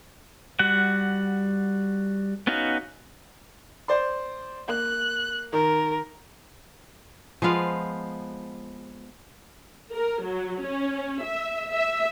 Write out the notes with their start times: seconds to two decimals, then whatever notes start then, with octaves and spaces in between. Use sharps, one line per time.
0.59 G3 F#4 F#5
2.47 B3 C#4 D#4 F#4 F5
3.88 C5 D5 C6
4.69 A#3 F#6
5.53 D#3 A#4
7.42 F3 G#3 B3 F5
9.94 A#4
10.25 F#3
10.64 C#4
11.25 E5
11.72 E5